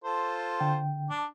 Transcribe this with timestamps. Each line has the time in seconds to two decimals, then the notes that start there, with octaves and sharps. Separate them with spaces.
0.04 F4 A4 C5
0.60 D3 G5
1.10 D4 D6